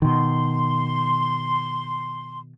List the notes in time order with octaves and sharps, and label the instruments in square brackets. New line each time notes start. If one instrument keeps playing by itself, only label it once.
[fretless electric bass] B2 D#3 [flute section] C6